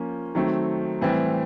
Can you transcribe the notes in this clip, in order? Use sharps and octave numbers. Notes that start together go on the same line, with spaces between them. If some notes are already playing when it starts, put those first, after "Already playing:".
Already playing: F3 A#3 C#4
D#3 F#3 A3 C4
A2 E3 G3 C4